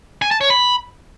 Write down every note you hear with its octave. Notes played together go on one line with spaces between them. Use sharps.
G#5
A5
C#5
B5